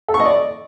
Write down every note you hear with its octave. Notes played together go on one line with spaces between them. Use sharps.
A4
C#6
D#5
D5